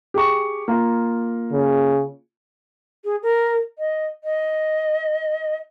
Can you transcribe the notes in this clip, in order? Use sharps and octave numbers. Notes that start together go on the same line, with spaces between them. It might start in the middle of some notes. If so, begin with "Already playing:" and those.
G4 G#4 C#6
A#3 F4
C#3
G#4
A#4
D#5
D#5